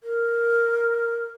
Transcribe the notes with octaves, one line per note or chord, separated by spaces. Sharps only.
A#4